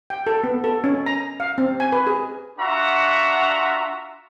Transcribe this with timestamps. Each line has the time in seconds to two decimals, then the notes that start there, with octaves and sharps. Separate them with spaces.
0.10 G5
0.27 A4
0.44 B3
0.64 A4
0.84 C#4
1.06 A#5
1.40 F5
1.58 C4
1.80 G#5
1.92 B4
2.07 G#4
2.59 D4 F4 F#4 E5 F#5 A#5